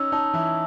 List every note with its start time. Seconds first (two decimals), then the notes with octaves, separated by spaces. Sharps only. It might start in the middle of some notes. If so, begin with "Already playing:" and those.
Already playing: C#4 D#4 E6
0.12 D#4 A5
0.34 E3 E4